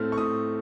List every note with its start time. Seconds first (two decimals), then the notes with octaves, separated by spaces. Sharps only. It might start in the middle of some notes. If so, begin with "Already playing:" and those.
Already playing: A2 A3 C4 F6
0.12 C#6
0.18 A2 D#6